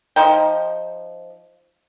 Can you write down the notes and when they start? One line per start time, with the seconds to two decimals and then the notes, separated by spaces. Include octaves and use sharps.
0.16 F3 D#4 G5